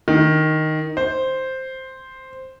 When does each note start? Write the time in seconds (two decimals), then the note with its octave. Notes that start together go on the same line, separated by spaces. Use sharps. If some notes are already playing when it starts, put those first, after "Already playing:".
0.08 D#3
0.97 C5